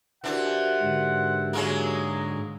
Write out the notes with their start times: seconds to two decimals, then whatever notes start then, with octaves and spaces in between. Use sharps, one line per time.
0.24 E3 D4 F#4 G4 A#4 C5 F#5
0.81 G#2 D3
1.53 F#3 G#3 A#3 G#4